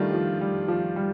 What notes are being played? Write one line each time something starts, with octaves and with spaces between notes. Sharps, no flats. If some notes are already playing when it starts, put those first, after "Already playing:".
Already playing: D#3 G3 A3 D4 F4
F3
G3
F3
G3